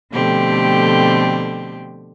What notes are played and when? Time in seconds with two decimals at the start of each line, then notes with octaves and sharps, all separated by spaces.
0.11 B2 D3 F3 A3 C4 G4